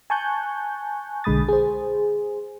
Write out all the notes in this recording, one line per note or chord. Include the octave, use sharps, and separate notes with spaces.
G#5 A5 C#6 F#6 G6
B1 D3 G#3 B5 D#6 A6
G#4 C5